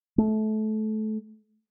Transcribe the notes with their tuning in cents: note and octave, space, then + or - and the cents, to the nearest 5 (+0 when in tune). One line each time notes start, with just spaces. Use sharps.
A3 -25